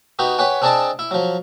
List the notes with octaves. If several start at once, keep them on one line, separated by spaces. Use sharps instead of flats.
B3 D#4 F#4 G4
G4 B4 C#5 F#5 G#5
C4 D4 G#4 D5 D#5 A5
E4
F3 F#3